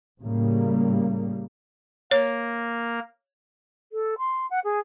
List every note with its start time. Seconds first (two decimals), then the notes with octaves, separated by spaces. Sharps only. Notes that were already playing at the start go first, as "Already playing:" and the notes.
0.21 A2 C#3 G3 A#3
2.11 A#3 A#4 C#5
3.92 A4
4.18 C6
4.50 F#5
4.64 G#4